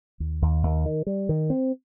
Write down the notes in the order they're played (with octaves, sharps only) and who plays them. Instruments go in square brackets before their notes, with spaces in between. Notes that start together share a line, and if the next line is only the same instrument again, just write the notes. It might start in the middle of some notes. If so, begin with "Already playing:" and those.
[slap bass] D#2
D#2
D#2
D#3
G3
D#3
C4